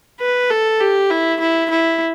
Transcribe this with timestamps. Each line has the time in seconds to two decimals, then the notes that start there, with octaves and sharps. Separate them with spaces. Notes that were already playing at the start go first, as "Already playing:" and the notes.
0.20 B4
0.50 A4
0.80 G4
1.10 E4
1.40 E4
1.70 E4